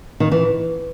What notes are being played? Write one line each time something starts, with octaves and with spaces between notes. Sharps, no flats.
D#3
E3